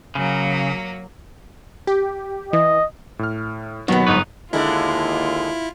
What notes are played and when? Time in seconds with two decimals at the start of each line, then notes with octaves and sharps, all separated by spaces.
0.15 C#3 F#3 A#3
1.87 G4
2.53 E3 D#5
3.19 A2 F6
3.88 D#2 B2 D#3 F#3 B3 F#4
4.07 G1 G#2 D#4 B4 C#6
4.53 D#2 D3 G#3 E4 F4 A#4